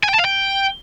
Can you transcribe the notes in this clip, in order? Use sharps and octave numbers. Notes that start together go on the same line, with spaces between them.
G#5
G5
A5
F5
G5